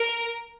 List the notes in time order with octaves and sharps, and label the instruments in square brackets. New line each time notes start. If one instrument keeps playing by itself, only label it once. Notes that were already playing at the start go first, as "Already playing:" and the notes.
Already playing: [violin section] A#4